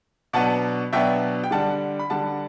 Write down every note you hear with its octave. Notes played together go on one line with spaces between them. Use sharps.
B2 F#3 B3 D4 F#5 A5
B2 F#3 B3 D4 E5 G5
G5
D3 G3 D4 F#5 A5
B5
D3 G3 D4 F#5 A5